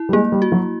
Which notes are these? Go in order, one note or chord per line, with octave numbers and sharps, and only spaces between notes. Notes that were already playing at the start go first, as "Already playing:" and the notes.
Already playing: E4
G3
G#3 A#3
G3
F#4
F#3